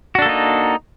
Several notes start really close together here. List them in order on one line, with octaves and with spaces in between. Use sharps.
F#4 D4 A4 A#3 D#4